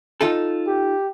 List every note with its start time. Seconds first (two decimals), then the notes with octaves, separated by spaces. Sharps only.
0.21 D#4 F4 A4
0.67 G4